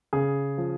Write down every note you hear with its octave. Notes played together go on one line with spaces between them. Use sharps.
C#3 G#4
F3